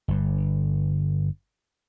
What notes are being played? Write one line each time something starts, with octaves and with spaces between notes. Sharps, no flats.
G1 G2